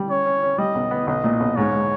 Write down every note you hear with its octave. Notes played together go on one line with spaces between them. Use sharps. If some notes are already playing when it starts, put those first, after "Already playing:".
Already playing: G3
C#4 C#5
C#4
C#4
G3 D#5
B1
B3
B1 D#5
A#2
B1
G#2 C#5
G#3